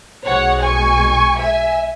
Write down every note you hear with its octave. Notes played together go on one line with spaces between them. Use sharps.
B1 B2 G#3 C#5 F#5
G#5 C#6
E5 G#5